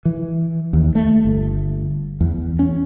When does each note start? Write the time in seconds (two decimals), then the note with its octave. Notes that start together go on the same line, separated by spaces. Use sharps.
0.05 E3
0.73 D#2
0.95 A3
1.25 G1
2.21 E2
2.59 C#4